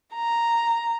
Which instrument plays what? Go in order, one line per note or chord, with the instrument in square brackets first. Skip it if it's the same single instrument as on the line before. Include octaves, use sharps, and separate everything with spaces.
[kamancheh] A#5